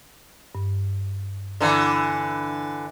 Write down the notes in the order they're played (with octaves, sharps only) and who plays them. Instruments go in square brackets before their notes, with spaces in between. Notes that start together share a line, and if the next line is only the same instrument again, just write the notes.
[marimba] G2
[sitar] D3 E3 [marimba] A#5